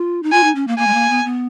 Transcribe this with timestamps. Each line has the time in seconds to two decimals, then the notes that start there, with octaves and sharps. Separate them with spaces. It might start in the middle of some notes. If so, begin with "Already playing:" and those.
Already playing: F4
0.23 D#4
0.32 F4 G#5
0.44 D#4
0.55 C#4
0.68 A#3
0.78 A#3 G#5
0.87 G#3
0.94 A#3
1.10 B3
1.25 B3